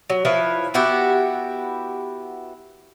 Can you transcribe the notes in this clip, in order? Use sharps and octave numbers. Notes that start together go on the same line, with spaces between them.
F#3
F3 E4 B4 C#5
B3 E4 F#4 G4